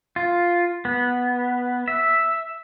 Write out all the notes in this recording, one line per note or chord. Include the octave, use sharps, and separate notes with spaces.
F4
B3
E5